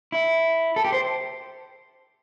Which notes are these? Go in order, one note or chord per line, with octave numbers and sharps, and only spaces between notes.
E4
A4
G4
C5